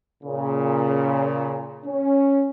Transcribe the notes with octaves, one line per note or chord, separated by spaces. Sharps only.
A#2 C#3
C#4